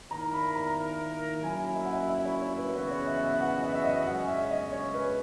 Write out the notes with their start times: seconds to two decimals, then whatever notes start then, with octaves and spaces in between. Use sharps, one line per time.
0.11 D#3 A#3 E4 A#4 A#5
0.33 B5
0.55 A#5
1.43 F#3 A#3 C#4 E4 G#5
1.76 E5
1.85 F#5
1.93 E5
2.09 E5
2.25 C#5
2.42 C#5
2.58 B4
2.74 F#2 C#3 E3 B3 F#4 C#5
2.91 C#5
3.07 E5
3.23 E5
3.41 F#5
3.62 E5
3.74 E5
3.84 D#5
4.06 F#2 C#3 G#3 C#4 F#5
4.28 E5
4.50 D#5
4.72 C#5
4.94 B4